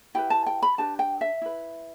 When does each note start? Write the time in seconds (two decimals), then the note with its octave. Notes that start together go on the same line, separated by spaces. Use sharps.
0.15 E4 G4 B4 G5
0.30 A5
0.46 G5
0.62 B5
0.78 D4 G4 B4 A5
0.99 G5
1.21 E5
1.42 E4 B4